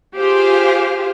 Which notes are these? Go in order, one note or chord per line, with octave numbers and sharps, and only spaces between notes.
F4 G4 G#4 C5 F5